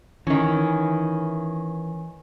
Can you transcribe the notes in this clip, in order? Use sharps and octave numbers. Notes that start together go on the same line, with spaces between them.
D#3 E3 C#4